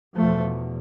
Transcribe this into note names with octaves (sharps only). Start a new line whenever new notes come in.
E2 B2 F3 A3